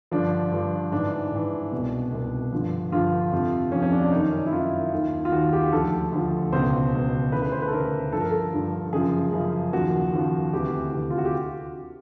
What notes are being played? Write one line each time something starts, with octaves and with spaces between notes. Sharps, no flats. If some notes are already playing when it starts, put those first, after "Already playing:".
G2 D3 F3 D4
G2 D3 F3
G#2 E3 D4
G#2 E3
C2 B2
C2 B2
G2 D3 F3
G2 D3 F3 F4
F2 C3 F3
F2 C3 F3 C#4
C#4
D4
D4
F#2 D#3 D#4
E4
F#2 D#3 F4
D#2 D#3
F4
D#2 D#3 F#4
G4
D2 D3 F3 A4
D2 D3 F3
C#2 B2 C5
C#2 B2
D2 C#3 E3 B4
B4
C5
B4
A4
D2 C#3 E3 A#4
G2 D3 F3 A4
A#4
A4
G2 D3 F3
F#2 C#3 F3 G#4
F#2 C#3 F3
D#2 C#3 F3 F#4
D#2 C#3 F3
D2 C3 E3 G4
D2 C3 E3
F4
F#4
G4